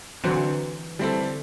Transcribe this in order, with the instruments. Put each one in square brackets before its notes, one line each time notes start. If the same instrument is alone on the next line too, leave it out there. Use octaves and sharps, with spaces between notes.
[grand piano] D3 F#3 C4 F#4 C5 [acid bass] E3
[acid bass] D3 [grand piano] G3 C4 E4 A4
[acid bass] E3
D3